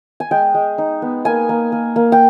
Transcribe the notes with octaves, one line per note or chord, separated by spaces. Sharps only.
G#5
G#3 G5
G#3
D#4
B3
A#3 G#5
A#3
A#3
A#3
G5